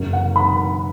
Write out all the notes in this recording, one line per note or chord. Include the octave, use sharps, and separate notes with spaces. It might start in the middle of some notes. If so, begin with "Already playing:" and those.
Already playing: F#1 F#2 C#3 F#3 A#3
F#5
B5